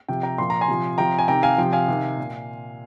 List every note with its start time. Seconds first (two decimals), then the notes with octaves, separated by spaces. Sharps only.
0.08 C3 F3 G5
0.23 G5 A#5
0.38 A#2 F3 C6
0.50 A#5
0.61 G#5 C6
0.68 C3 F3
0.98 C3 F3 G5 A#5
1.18 G#5
1.28 C3 D#3 G5 A#5
1.43 F5 G#5
1.58 C3 F3 G5
1.73 F5 G#5
1.88 C3 D#3
2.18 A#2